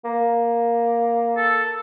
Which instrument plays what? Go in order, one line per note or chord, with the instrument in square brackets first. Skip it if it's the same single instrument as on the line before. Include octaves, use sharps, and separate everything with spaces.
[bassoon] A#3
[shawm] A4